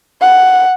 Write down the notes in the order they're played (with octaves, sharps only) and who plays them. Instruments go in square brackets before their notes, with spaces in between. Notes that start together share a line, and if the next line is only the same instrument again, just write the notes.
[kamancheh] F#5